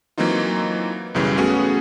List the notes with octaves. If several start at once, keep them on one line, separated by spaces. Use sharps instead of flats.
E3 F#3 A#3 C4 D#4 F4
B1 F#2 C#3 E3 G3
A3 B3 C#4 F#4 G#4